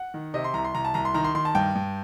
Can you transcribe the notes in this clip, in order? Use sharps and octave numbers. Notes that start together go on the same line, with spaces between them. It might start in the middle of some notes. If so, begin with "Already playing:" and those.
Already playing: F#5
D#3
C3 D#5
C6
C2 A#5
C6
C2 A#5
A5
C2 A#5
C6
D#3 A#5
C6
D#3 C6
A5
G2 G5
G2